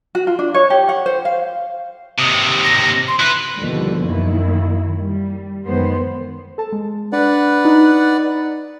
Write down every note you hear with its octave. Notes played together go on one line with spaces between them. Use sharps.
F#4
F4
D4
C#5
G4
F#5
C5
F5
D#2 C3 D#6
A#6
C6
E4 B4 F#6
D#2 B2 D3 F3 G3
F#2 D#3 A#3 E4
G3
F#2 D#3 G#3 B3 C5
A4 A5
G#3
D4 B4 D5 F#5
D#4